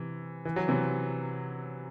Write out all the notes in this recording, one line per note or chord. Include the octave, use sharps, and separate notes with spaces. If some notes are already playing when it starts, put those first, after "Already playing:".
Already playing: C3 E3
E3
F#3
C3 E3